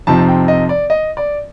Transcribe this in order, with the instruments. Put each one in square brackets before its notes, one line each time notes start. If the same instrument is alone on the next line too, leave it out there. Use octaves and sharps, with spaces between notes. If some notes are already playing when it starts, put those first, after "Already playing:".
[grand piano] F2 C3 F3 C4 D#4 A5
G5
D#5
D5
D#5
D5